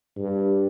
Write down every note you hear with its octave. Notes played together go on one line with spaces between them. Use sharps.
G2